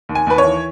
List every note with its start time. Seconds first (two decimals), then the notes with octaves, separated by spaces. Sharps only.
0.09 D#2
0.15 G#5
0.27 D#2 B4
0.38 C#5
0.44 E3